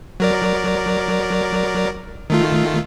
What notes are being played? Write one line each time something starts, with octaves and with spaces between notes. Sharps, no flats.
F#3 A#4 D5
D#3 A3 F4